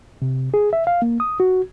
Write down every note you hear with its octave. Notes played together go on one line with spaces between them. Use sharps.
C3
G#4
E5
F5
A#3
D#6
F#4